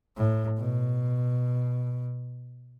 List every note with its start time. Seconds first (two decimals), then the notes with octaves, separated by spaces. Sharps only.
0.17 A2
0.59 B2